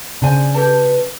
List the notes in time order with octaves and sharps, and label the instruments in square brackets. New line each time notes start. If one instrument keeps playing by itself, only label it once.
[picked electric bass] C#3 [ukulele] D4 C5 G#5 [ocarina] D5
[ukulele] G4 A4 A5 [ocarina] B4